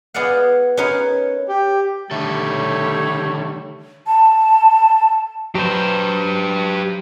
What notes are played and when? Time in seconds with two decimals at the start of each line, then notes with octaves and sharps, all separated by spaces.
0.14 B3 G#4 D5 D#5 F5 F#5
0.77 C#4 D#4 G#4 A#4 B4 C#5
1.49 G4
2.11 D3 D#3 G3 A3 A4 C#5
4.07 A5
5.55 F#3 G4 B4 C5